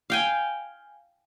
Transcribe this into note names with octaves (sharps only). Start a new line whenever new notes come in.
F5 G5 G#5